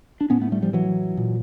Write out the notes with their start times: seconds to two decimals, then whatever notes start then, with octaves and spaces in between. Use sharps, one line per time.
0.21 D4
0.30 A2 B3 C#4
0.41 A3 B3
0.52 G3 A3
0.62 F3 G3
0.73 E3 F#3
1.17 A#2